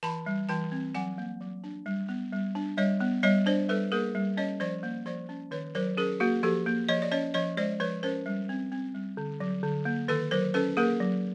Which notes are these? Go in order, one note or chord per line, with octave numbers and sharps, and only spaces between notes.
E3 A5 B5
G3
E3 G5 A5
C4
F#3 F#5 G#5
A#3
F#3
D4
G3
B3
G3
D4
G3 C#5 D#5
B3
G3 C#5 D#5
D4 C5 D5
G3 A4 B4
A#3 G#4 A#4
G3
C#4 C#5 D#5
F3 C5 D5
A#3
F3 C5 D5
C#4
D#3 B4 C#5
F#3 A#4 C5
C#4 G#4 A#4
A#3 F#4 G#4
F3 G4 A4
A#3
F3 C#5 D#5
D5
C#4 C#5 D#5
F3 C#5 D#5
G#3 C5 D5
F3 B4 C#5
C#4 A#4 C5
G3
C4
C4
G3
D3
F#3
D3
A#3
D#3 A4 B4
F#3 A#4 C5
C#4 A4 B4
A#3 G#4 A#4
F#3